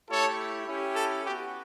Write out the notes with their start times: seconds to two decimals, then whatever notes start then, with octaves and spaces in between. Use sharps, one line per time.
0.09 A3 E4 G4 A4 C#5
0.66 C#4 E4 G4
0.95 A4
1.24 B3 F#4 G4